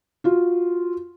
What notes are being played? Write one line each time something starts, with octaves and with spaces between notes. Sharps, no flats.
F4 F#4